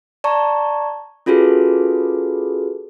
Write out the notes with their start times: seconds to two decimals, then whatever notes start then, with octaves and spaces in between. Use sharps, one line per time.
0.24 D5 A5 A#5 C#6
1.26 C#4 F4 F#4 G#4 A4 B4